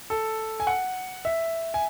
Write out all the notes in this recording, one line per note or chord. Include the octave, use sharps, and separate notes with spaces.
A4
G#5
F#5
E5
G#5